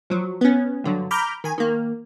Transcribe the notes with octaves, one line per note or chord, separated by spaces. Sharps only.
F3 F#3
B3 C#4
G2 D3 F#3
A#5 B5 D6 F6 G6
D#3 G#5
D#3 A#3